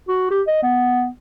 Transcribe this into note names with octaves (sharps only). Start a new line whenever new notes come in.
F#4
G4
D#5
B3